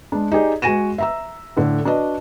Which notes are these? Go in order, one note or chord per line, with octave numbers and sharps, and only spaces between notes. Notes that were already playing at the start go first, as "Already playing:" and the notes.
G#3 D4
D#4 G4 G#4 D5
G#3 F#4 G#5 A#6 D#7 E7
E5 A#5 E6
A2 D3
D4 F#4 B4 D5 D#5